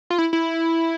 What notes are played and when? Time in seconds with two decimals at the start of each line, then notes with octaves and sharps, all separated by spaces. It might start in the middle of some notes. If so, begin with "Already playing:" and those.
0.10 F4
0.18 E4
0.33 E4